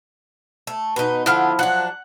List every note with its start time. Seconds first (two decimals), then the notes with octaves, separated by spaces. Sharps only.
0.67 A3
0.96 B2 D#4 B4
1.26 D3 F3 B3 E4 F6
1.59 F#3 D4 F#5